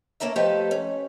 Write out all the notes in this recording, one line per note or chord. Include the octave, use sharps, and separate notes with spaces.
A#3 C#4 A4 A#4 E5
F3 A3 G4 A4 B4 D#5
C#4